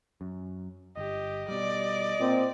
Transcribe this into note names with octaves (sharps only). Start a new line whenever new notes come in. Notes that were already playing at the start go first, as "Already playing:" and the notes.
F#2
G1 G4 D#5
B2 G3 D5
A#2 C4